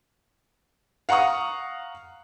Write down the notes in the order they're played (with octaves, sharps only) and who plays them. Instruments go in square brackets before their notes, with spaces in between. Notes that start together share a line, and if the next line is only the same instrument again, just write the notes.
[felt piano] F5 F#5 A#5 C#6 D#6